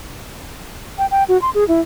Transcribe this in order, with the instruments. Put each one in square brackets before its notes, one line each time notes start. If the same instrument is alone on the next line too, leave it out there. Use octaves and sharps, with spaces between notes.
[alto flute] G5
G5
F#4
C6
G#4
E4